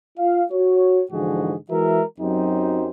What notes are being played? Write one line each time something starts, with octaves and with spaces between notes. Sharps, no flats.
F4 F5
F#4 C#5
G#2 D3 E3 F3 F#4 G#4
E3 G#3 F#4 A#4 E5
F#2 F#3 C4 D#4 G4 C5